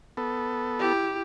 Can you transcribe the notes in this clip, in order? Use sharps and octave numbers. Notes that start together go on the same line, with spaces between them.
B3 A4
E4 G4